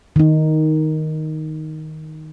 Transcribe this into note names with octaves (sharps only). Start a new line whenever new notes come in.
D#3 D#4